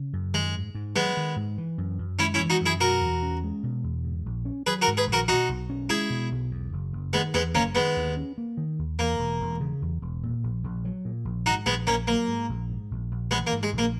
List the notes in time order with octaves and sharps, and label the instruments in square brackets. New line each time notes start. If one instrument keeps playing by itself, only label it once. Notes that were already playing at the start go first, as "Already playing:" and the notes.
Already playing: [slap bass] C#3
F#2
[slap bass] D#3 [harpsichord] G#3
[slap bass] G#2
G#2
[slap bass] F#3 [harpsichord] G#3 B3
[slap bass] D#3
G#2
E3
F#2
F#2
[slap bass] G#3 [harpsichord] C#4 E4
[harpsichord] C#4 E4
[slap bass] E3
[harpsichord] D#4 F#4
[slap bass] F#2 [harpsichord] E4 G#4
[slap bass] B2 [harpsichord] F#4 A#4
[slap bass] E2
C#4
G#3
B2
E2
G#2
A#1
C#4
[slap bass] F#3 [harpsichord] G#4 B4
[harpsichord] F#4 A#4
[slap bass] G#2
[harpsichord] G#4 B4
[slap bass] A#1
[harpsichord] F#4 A#4
[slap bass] B2 [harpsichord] D#4 F#4
[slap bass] B1
C#4
[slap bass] G#3 [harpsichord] E4 G#4
[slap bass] B2
B1
E2
F#1
F#1
[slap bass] D#3 [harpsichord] G#3 B3
[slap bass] E2 [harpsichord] G#3 B3
[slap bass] F#1 [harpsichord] A#3 C#4
[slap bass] D#3 [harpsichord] G#3 B3
[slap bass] D#2
C#4
A#3
D#3
D#2
[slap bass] E2 [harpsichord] A#3
[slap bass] E1
E1
C#3
E2
E1
A#2
A#1
A#1
F#3
A#2
A#1
[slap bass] G#2 [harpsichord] D#4 F#4
[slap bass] A#1 [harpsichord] G#3 B3
[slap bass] A#1 [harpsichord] A#3 C#4
[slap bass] F#3 [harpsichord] A#3
[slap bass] G#2
A#1
G#2
A#1
A#1
[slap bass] E3 [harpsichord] G#3 B3
[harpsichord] A#3
[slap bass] G#2
[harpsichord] G#3
[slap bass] A#1
[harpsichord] A#3